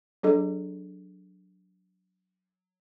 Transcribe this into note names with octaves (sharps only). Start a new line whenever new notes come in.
F#3 D4 G#4 A4 D#5